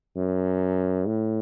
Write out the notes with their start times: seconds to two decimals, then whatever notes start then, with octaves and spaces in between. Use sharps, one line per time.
0.17 F#2
1.07 A2